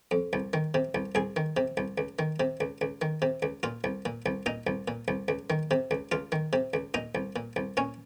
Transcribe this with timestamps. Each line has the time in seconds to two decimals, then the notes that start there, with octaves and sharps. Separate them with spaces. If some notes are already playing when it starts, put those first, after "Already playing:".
0.11 F2
0.33 C2
0.53 D#3
0.74 C3
0.95 C2
1.15 C2 G#4
1.36 D#3
1.57 C3
1.77 C2
1.98 C#2
2.19 D#3
2.40 C3
2.61 C#2
2.81 C#2
3.02 D#3
3.22 C3
3.42 C#2
3.63 A#2 F4
3.84 C2
4.05 A#2
4.26 C2
4.46 A#2 D#4
4.67 C2
4.88 A#2
5.08 C2
5.28 C#2
5.50 D#3
5.71 C3
5.91 C#2
6.12 C#2 F4
6.32 D#3
6.53 C3
6.74 C#2
6.94 A#2 D#4
7.15 C2
7.36 A#2
7.56 C2
7.77 A#2 C#4